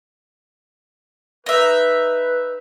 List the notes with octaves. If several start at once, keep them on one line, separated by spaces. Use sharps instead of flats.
D#4 B4 E5